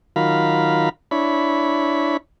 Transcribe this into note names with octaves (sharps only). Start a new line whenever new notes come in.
D#3 F#3 F4 A#4 F5 B5
D4 E4 C#5 B5